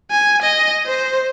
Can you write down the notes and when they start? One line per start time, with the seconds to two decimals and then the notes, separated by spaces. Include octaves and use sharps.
0.11 G#5
0.42 D#5
0.87 C5